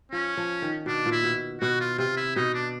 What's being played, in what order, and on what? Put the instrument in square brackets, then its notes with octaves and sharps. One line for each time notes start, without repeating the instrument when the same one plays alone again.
[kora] F3 [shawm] C#4
[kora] F3
D#3
[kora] B2 [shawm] D4
[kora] A#2
[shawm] E4
[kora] B2
[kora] B2 [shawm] F#4
[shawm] F4
[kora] C3 [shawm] F4
[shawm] E4
[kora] B2 [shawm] D#4
[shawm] D4